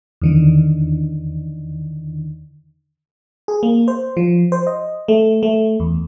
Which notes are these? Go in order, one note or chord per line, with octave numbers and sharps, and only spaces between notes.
E2 D3 D#3
G#4
A#3
C5
F3
C5
D#5
A3
A3
E2